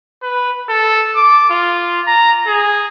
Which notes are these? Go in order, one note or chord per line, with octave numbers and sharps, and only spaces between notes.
B4
A4
D6
F4
A#5
G#4